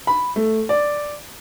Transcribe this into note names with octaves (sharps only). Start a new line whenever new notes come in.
B5
A3
D5